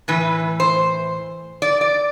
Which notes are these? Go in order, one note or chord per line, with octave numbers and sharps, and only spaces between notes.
A2 E3 B4
C5
D5
D5